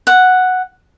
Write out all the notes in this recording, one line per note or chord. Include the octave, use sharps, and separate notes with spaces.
F#5